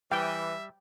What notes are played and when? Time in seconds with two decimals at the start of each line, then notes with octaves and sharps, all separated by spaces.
0.12 E3 G3 E5 G5